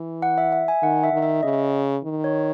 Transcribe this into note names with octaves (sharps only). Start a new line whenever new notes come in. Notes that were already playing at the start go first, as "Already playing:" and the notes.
Already playing: E3
F#5
E5
E5
G#5
D#3 F#5
E5
D#3
E5
C#3 D#5
D#3
C#5